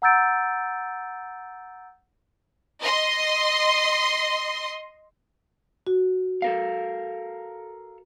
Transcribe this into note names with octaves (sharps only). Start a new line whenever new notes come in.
F#5 A#5 E6 G6 A6 D7
D#5 C6
F#4
A4 A#4 F5